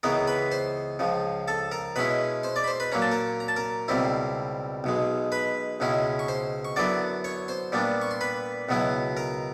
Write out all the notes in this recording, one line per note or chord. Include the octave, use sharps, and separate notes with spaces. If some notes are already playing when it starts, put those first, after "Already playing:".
C#2 C#3 E3 G#3 B3 A#4 A#5
B4 B5
C5 C6
C#2 C#3 F3
A4 A5
A#4 A#5
B2 G#3 C#4 E4 B4 B5
C5 C6
D5 D6
B5
C5 C6
B4 B5
A#2 F#3 A#3 C#4 A#5
A5
A#4 A#5
A#5
A5
A#4 A#5
C#2 B2 G3 C4 E4
B1 B2 G#3
B4 B5
C#2 B2 G#3 C#4 E4
C#6
C5 C6
C#6
F#2 D3 F#3 B3 E4 D5 D6
C#5 C#6
C5 C6
A#2 G3 B3 D4
C#6
C6
B4 B5
C#2 B2 F#3 B3 E4
A#4 A#5